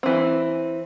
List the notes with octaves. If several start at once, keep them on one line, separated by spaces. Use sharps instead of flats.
E3 C4